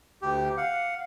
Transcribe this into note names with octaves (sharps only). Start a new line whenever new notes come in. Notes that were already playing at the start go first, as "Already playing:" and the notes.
D2 G4
F5 F#5